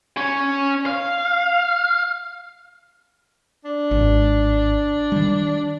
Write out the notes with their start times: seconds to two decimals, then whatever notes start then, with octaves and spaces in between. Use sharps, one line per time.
0.17 C#4 C#5
0.86 F5
3.65 D4
3.91 G#1
5.12 D#3 G3